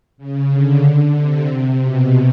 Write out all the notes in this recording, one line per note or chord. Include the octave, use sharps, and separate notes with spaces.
C#3
D3
C3
B2